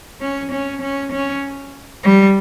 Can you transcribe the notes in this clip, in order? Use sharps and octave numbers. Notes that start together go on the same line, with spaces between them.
C#4
C#4
C#4
C#4
G3